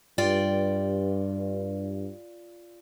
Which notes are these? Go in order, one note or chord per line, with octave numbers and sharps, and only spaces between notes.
G2 F4 D5 G5